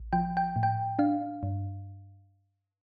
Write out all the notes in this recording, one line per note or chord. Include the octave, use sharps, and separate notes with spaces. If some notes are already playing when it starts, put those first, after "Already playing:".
Already playing: A1
F3 G5
G5
A2
G5
D4 F5
G2